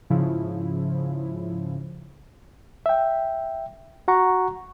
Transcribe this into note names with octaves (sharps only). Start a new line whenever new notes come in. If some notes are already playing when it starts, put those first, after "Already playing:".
G#2 C#3 F3 E4
E5 G5
F#4 F#5 A#5 C#6